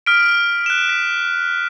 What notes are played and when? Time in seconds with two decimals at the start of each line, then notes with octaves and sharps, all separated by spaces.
0.06 D#6 F6 B6 D7
0.66 F#6 E7
0.89 B6